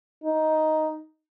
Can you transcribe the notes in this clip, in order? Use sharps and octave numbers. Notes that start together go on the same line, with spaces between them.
D#4